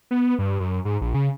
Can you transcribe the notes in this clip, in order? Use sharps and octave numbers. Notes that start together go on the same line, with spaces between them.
B3
G2
F#2
G#2
A#1
C#3